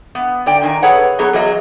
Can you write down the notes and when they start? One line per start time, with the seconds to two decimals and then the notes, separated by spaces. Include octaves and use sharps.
0.15 B3
0.46 D3 D5 G5
0.61 A#2 D#3 G#5
0.82 G#4 A4 B4 C#5 F#5
1.19 F#3 B3 G#4 A4 C#5
1.33 E2 F#3 G#4 D#5